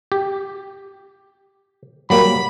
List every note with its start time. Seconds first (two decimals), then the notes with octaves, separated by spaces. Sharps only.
0.12 G4
2.10 F#3 G3 A#3 B5